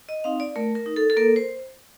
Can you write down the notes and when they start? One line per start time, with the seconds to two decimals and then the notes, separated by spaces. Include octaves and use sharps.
0.09 D#5
0.24 C4 D#4 F5
0.40 D5
0.56 A3 A#4
0.75 A#4
0.86 D#4
0.96 A4
1.10 A4
1.17 A#3 A#4
1.36 C5